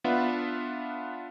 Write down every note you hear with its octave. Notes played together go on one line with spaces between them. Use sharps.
B3 D4 F4 B4 E5 F#5